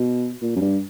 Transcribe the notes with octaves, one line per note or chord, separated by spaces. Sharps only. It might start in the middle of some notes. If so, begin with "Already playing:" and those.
Already playing: B2
A#2
F#2
G2